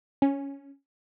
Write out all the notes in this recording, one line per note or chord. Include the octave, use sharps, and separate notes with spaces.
C#4